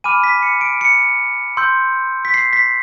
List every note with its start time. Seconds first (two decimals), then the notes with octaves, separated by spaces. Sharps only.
0.04 G#5 B5 D6 F6 D#7
0.24 B6
0.42 C#7
0.61 D7
0.81 C#7
1.57 C6 E6 G6
2.25 B6
2.34 C7
2.53 B6